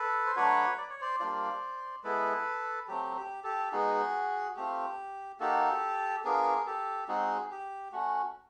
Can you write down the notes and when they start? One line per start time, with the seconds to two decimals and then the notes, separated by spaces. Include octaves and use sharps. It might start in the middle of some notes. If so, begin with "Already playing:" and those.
Already playing: A4 B4
0.26 C5
0.36 F#3 A3 D4 F#4 B4 C#5
0.78 D5
0.90 C#5
1.01 C5 D5
1.20 G3 A#3 D4 F4 C5 D5
2.04 G#3 B3 E4 A4 B4
2.88 F#3 A3 C4 G4
3.16 G4
3.44 G4 A4
3.72 G#3 B3 D#4 F#4 G#4
4.56 A3 C4 F4 G4
5.40 A#3 D#4 F#4 G4 A4
6.24 B3 D4 F4 G#4 A#4
6.66 G4 A4
7.08 G#3 C4 D#4 F#4 G#4
7.51 G4
7.92 A3 C#4 F#4